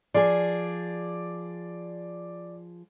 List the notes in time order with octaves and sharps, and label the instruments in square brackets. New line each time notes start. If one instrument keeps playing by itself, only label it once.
[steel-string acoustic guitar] F3 G#4 [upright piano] D5